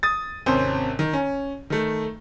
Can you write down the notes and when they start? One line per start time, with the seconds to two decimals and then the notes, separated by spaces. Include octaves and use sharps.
0.03 D#6 A6
0.46 G#1 C3 C#4 C5
0.99 D#3
1.13 C#4
1.70 D#3 A3